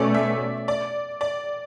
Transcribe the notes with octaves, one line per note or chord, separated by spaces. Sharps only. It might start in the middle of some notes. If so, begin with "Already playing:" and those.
Already playing: B2 A3 C#4 C#5 D5
E5
D5
D5